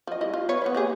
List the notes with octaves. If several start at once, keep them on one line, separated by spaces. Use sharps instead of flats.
F3 D#5
G3 E4 D#5
F4
B3 B4 C#5
E3 A3 B3
A#3 G4 G#4